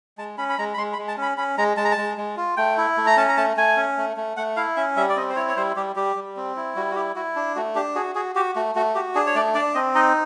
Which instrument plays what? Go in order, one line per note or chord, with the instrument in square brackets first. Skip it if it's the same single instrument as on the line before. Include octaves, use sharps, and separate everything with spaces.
[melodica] G#3 A5
C#4 B5
B5
G#3 A#5
B5
G#3 C6
B5
G#3
A5
C#4 B5
C#4 B5
G#3 A#5
G#3 A5
A#5
A5
G#3
G#3
F4
A3 G5
E4
A3
A#5
C#4 A5
A#5
A3 A5
A3 G#5
C#4
A3
A3
A3 F#5
E4 F5
C#4 E5
G3 E5
D5
C4 D#5
C5
E4 C#5
C#5
G3 C5
G3 G4
G3 G4
G3
C4
E4
G3 F#4
F#4
E4 G4
E4 F#4
D4
A3 F#4
D4 G4
F#4 G#4
F#4 G#4
F#4 G4
A3 F#4
A3 F#4
F#4 G4
D4 G#4
C#5
A3 D5
D4 D5
C4 D#5
D#4 D#5